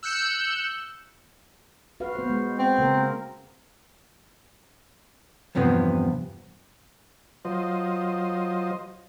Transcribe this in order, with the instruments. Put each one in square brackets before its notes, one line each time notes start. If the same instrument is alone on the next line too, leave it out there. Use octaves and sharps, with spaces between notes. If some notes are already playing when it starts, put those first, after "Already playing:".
[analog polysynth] E6 F#6 G6 C#7 E7
[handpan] F#4 B4 F5
B3 C5
G#3
[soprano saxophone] C4
[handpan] C#3 A#3 A#4
[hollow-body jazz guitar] E2 G2 C3 F3 B3
[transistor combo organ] F#3 F4 C5 D#5